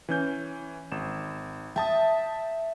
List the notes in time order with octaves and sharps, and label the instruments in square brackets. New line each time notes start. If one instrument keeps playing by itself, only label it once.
[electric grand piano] E3 C#4 G6
G#1 E7
[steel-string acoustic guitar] E5 [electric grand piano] G5 A5 D#6